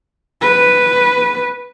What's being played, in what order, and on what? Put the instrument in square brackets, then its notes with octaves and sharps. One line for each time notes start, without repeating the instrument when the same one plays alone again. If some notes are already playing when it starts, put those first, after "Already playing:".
[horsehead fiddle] B4